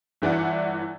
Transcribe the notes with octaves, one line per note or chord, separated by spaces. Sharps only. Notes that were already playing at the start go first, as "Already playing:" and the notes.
G1 E3 D5 F#5